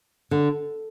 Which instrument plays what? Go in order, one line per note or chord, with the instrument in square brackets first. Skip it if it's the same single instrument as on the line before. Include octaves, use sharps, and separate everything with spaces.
[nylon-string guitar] D3